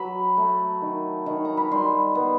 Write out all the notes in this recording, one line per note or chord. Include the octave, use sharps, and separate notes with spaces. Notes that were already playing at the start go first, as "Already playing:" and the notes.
Already playing: F#3 B5
A3
D#3
D#3
A#5
B5
G3 C6
B3